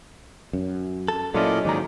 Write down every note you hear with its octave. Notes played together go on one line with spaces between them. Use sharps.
F#2
A4
A#2 F#3 C#4 E4 F4 A4 D5 D#5
D#2 G#2 D#3 D5 A#5